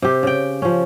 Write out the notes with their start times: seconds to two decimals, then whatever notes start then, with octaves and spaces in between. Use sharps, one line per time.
0.02 C3 G4
0.23 C#3 G5
0.62 F3 C#4